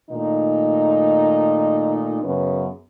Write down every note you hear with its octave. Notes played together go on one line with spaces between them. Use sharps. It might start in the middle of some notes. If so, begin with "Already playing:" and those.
A#2 D#3 A3 D#4
F#2 C#3 B3